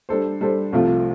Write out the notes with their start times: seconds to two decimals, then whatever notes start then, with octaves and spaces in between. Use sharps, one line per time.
0.09 G3 D4 A4 C5
0.41 G3 D4 A4 C5
0.72 C2 C3 F3 A3 F4